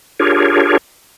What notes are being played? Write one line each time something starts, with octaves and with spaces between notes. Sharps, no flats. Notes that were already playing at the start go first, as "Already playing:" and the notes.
D4 F4 G4 G#4 A#4 C#5